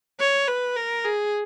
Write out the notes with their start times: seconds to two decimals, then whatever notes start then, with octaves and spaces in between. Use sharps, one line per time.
0.19 C#5
0.48 B4
0.76 A#4
1.04 G#4